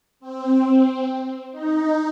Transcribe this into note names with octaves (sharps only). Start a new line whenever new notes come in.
C4
D#4